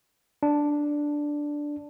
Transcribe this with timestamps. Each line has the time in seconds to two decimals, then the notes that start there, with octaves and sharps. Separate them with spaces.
0.43 D4